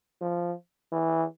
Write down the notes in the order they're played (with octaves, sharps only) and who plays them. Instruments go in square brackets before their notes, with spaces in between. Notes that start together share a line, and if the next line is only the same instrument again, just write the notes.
[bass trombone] F3
E3